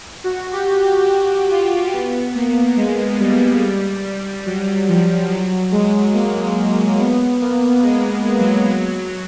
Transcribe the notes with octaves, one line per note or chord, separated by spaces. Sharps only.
F#4
G4
G4
F#4
F4
B3
A#3
G#3
G3
F#3
F3
F#3
G#3
A#3
B3
A#3
G#3
F#3
F#3